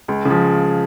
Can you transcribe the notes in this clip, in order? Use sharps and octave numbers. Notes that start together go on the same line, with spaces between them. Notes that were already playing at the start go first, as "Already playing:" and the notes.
C#2
C#3 F3